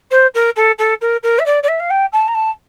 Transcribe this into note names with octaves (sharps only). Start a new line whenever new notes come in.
C5
A#4
A4
A4
A#4
A#4
E5
D5
D5
E5
F5
G5
A5
A#5
A5